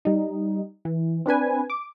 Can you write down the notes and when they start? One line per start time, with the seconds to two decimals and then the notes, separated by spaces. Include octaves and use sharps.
0.05 G3 D#4
0.85 E3
1.26 C4 D4 B4 G#5
1.70 D6